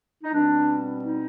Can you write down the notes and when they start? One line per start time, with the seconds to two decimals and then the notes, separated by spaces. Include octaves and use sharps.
0.23 D#4
0.33 B2 G3 C4 D4
1.04 D#4